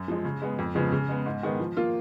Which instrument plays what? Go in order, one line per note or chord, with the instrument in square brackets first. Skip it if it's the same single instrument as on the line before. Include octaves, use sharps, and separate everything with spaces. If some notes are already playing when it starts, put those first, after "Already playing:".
Already playing: [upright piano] F#2
F3 G#3
C#3
G#3 B3
F2
C#3 F3 G#3 B3
C#3
G#3 B3
G#2
D#3 G#3 B3
F3
A#3 F4